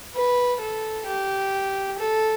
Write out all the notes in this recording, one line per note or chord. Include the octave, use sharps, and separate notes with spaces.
B4
A4
G4
A4